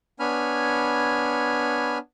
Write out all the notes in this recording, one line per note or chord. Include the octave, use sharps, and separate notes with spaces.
B3 D4 C#5 G#5 B5 F6